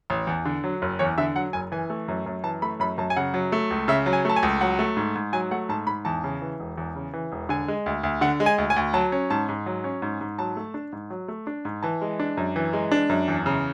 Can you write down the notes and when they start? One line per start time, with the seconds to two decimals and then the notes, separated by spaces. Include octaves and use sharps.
0.10 A1
0.27 E2
0.45 D3
0.64 F#3
0.82 F#1
0.99 E2 C#5
1.18 D3 E5
1.35 F#3 F#5
1.53 F#1 G#5
1.72 E3 G#5
1.90 A3
2.08 F#2
2.26 F#2
2.44 E3 A5
2.62 A3 B5
2.80 F#2 B5
2.98 F#2 A5
3.10 G#5
3.16 C#3 F#5
3.34 F#3
3.52 A3
3.71 C#2
3.88 C#3 E5
4.06 F#3
4.13 G#5
4.25 A3 A5
4.36 G#5
4.43 C#2
4.61 F#3 F#5
4.79 A3
4.97 G#2
5.15 G#2
5.33 F#3 G#5
5.51 A3 F#5
5.69 G#2 A5
5.87 G#2 B5
6.05 E2 A5
6.24 C#3
6.42 E3
6.60 E1
6.78 E2
6.95 C#3
7.13 E3
7.32 E1
7.49 D3 G#5
7.68 G#3
7.86 D2
8.03 D2
8.21 D3 F#5
8.40 G#3
8.46 G#5
8.58 D2
8.70 G#5
8.76 D2
8.94 F#3 A5
9.12 C#4
9.30 G#2 A5
9.49 G#2
9.66 F#3
9.84 C#4
10.02 G#2
10.21 G#2
10.39 F#3 A5
10.57 A3
10.74 D4
10.93 G#2
11.10 F#3
11.28 A3
11.47 D4
11.65 G#2
11.83 E3 A5
12.02 G#3
12.20 D4
12.37 F#2
12.56 E3
12.73 G#3
12.92 D4
13.09 F#2
13.28 E2
13.46 C#3